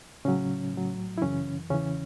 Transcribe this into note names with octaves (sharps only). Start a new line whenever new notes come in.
A2 C#3 F#3 C#4
A2 F#3
E4
F#2 C#3 E3 C#4
E2 C#3 E3 C#4